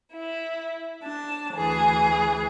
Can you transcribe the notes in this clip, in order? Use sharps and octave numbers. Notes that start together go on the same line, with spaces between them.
E4
D4 A5
D2 E3 G#4